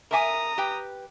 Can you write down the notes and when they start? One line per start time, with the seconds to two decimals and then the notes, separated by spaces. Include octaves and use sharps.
0.11 A#4 E5 G#5 A#5 D#6
0.58 G4 B4 G5